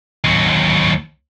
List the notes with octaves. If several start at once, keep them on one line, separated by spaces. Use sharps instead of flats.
D#2 F#3